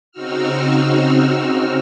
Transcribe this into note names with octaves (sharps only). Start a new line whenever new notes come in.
C#3 C4 D#4 F#4 E6 F6